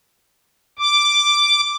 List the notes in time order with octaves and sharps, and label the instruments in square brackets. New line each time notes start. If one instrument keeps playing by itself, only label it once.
[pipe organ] D6